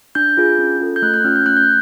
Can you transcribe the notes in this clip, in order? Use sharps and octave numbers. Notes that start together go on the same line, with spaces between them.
D4 G6
F4 G#4
C#4
F4 A4
G6
A3 F#6
F#6
C#4 F4 F6
G6
A3 F#6
G6